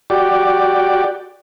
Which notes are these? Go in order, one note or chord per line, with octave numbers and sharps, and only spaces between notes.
F#4 G4 D5